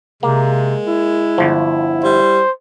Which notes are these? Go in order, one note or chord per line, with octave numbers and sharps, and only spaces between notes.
C3 G#3 A#3
E4
G1 F3
G3 C5